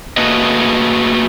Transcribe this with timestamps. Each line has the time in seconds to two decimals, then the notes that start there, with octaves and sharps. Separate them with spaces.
0.17 A3 A#3 F#4 G#4 B4 D#5